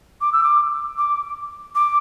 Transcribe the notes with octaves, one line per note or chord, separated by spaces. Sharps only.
D6
E6
D6
D6
D6